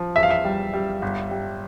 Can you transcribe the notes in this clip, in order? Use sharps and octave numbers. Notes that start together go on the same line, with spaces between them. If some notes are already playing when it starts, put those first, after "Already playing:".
Already playing: F3
E2 E5
F5
E5
G3
G3
G1
G3